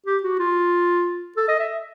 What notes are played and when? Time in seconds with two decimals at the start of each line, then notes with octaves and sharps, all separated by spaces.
0.06 G4
0.23 F#4
0.39 F4
1.37 A4
1.48 D#5
1.60 E5